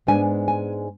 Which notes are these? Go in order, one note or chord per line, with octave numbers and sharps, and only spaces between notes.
G#2 G#3 B3 D4 G#5
G#5